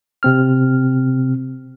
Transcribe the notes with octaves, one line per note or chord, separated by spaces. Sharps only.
C3 C4 F6